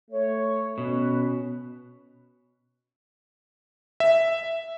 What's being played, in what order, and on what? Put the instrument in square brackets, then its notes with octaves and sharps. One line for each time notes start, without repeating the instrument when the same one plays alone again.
[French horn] A3 [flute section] C#5
[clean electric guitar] B2 [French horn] C#4 [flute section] B4
[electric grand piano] E5